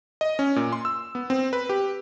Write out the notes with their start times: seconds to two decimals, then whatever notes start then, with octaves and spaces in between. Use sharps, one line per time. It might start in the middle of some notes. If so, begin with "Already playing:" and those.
0.21 D#5
0.39 C#4
0.56 A#2
0.72 C6
0.85 E6
1.15 B3
1.30 C4
1.53 B4
1.69 G4